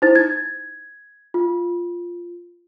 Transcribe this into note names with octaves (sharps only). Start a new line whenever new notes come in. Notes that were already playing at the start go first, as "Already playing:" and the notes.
D#4 E4 C5 A6
G#6
F4